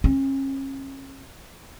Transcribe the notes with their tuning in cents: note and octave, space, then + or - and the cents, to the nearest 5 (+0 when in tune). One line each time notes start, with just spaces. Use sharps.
C#4 -35